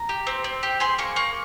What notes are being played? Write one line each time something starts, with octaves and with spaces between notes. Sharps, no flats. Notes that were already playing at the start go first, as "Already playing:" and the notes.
Already playing: A#5
G4
C4
C4
G4
G#4 C6
A#3 C#6
A#3 C#6